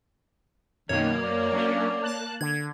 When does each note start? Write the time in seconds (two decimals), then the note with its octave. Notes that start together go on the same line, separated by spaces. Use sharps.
0.89 F#2 B2 D#3 A#3 C#5
1.22 F#2 D5
1.52 F#3 C#4 D4
2.02 A5 F#6
2.41 D3 G#6